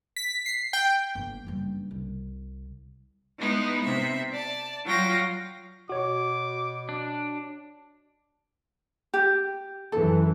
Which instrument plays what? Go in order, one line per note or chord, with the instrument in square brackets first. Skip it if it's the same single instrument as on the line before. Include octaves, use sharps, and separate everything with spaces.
[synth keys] B6
C7
G5
[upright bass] G1 A#3
F#1 G2
C2
[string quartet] G#3 B3 D#4 E4
C3 E5
D5 A5
F#3 F4 F5 G5 A#6
[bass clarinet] B2 [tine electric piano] F#4 C#5 [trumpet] D6
[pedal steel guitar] D4
[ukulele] G4
[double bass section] F#2 E3 [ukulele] A4